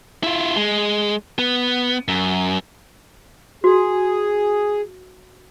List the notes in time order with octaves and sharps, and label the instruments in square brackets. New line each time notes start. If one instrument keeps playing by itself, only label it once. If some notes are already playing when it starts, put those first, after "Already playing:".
[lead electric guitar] E4 F4
G#3
B3
F#2
[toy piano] F#4 [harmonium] G#4